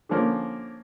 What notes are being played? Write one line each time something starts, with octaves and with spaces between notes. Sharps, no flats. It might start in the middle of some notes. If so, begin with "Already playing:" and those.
D3 F3 A#3 C#4